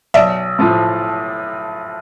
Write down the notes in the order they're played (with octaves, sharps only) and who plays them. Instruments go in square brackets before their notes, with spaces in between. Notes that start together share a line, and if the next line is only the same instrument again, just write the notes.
[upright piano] B1 [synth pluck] D5 E5
[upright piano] A2 F3 A3